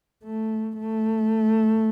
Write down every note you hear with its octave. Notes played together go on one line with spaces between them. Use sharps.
A3
A3